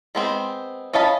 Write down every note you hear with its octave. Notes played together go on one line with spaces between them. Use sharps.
G#3 B3 C4
C#4 D#5 F5 A5 B5